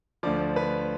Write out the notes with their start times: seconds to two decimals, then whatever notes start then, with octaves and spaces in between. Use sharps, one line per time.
0.23 D2 D3 F3 D5
0.56 B4